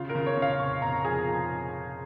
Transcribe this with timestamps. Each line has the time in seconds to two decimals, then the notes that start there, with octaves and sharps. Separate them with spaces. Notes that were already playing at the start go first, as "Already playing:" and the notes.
Already playing: C#3 F4
0.09 A#4
0.15 C#3
0.26 C#5
0.37 C#3
0.42 F5
0.59 F1 C#6
0.82 F1 A#5
1.05 F3 G#4
1.27 F3